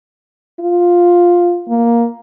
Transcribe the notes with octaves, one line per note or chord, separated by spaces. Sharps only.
F4
A#3